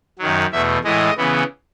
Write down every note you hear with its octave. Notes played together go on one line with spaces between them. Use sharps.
F#2 D#3 F#3
E2 B2 A3 E5
A2 E3 G#3 D#5
C#3 E3 B3